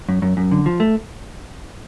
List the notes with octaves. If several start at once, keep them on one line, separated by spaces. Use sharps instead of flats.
F#2
F#2
F#2
D3
F3
A3